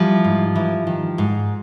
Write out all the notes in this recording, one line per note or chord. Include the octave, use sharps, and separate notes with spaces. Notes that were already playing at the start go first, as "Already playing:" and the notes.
Already playing: E3 F3 G3
G#2
E3
D#3
G#2